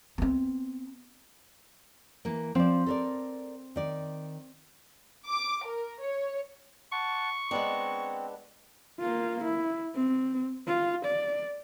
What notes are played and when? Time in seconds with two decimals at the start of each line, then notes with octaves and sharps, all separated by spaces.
0.18 B3 C4
2.25 E3 A#3
2.55 F3 C4 D5
2.86 A4 A#4 D5
3.76 D#3 D5
5.27 D6
5.65 A#4
6.00 C#5
6.92 F#5 A5 C#6
7.51 G#3 B3 C4 D4
8.99 A#3 F4
9.44 E4
9.95 C4
10.67 F4
11.05 D5